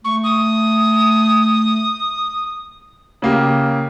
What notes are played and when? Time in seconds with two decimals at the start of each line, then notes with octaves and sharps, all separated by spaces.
0.05 A3 C#6
0.24 D#6
3.22 C#3 A#3 G4